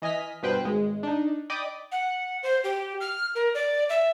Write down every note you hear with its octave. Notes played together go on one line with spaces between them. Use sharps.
E3 D#5 G#5 F6 B6
G2 B2 B4 C5 G5 F#6
G#1 G#3
D4 D#4
D5 D#5 G5 B5 D6 D#6
F#5
C5
G4
F6
A#4
D5
E5